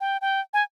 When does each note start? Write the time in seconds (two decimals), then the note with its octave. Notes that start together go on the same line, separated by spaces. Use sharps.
0.01 G5
0.21 G5
0.54 G#5